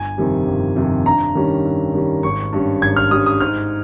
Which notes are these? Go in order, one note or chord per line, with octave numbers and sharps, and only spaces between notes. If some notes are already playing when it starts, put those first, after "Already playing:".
Already playing: G1 G#5
F2 C3 D#3 G3
G1
F2 C3 D#3 G3
G2 A#5
D#3 G3 C#4
G2
D#3 G3 C#4
G#1 C#6
G2 G3 C#4
G#1 G#6
F6
G2 G3 C#4 D#6
D#6
G#2 F6